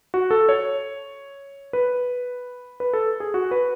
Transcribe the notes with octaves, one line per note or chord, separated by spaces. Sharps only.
F#4
A4
C#5
B4
B4
A4
G#4
F#4
B4